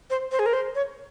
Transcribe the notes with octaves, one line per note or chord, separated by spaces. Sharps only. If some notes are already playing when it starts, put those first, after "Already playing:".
C5
C5
G#4
A#4
C5
C#5